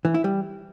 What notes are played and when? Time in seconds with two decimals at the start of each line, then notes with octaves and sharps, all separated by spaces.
0.05 E3
0.14 E4
0.24 G3